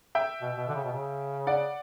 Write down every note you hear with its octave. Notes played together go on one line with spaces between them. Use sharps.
E5 G5
B2
B2
D3
C#3
B2
C#3
D5 F#5